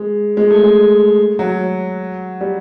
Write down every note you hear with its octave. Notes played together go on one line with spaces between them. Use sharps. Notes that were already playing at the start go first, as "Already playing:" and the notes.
Already playing: G#3
G#3
A3
G#3
F#3
G3